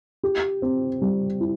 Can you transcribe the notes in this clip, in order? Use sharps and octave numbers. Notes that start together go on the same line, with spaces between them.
G4
C4
G3
E4